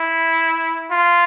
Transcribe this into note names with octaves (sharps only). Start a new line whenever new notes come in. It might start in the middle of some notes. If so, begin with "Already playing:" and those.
Already playing: E4
F4